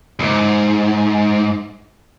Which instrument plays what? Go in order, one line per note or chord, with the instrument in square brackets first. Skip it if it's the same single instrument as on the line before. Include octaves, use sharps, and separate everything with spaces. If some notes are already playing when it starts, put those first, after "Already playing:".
[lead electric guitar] B1 G#2